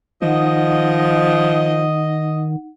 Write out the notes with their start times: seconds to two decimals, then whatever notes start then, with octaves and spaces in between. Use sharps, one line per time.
0.22 D#3 F3 D#4 D#5 F#5